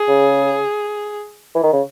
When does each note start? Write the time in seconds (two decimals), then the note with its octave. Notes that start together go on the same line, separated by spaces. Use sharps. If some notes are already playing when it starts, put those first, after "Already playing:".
Already playing: G#4
0.08 C#3
1.55 E3
1.63 D#3
1.73 C#3